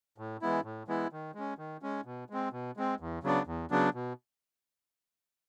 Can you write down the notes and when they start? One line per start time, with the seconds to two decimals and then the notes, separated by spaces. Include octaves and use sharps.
0.18 A2
0.42 E3 G#3 B3 E4
0.64 A2
0.88 E3 G#3 B3 E4
1.12 D#3
1.35 G#3 C#4
1.58 D#3
1.82 G#3 C#4
2.05 B2
2.30 G#3 C4
2.52 B2
2.77 G#3 C4
3.00 E2
3.23 C#3 F#3 B3 D4
3.47 E2
3.71 C#3 F#3 B3 D4
3.94 B2